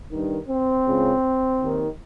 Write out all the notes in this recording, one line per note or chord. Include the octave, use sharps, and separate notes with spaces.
G2 D#3
C4
C#2 C#3
D#2 D#3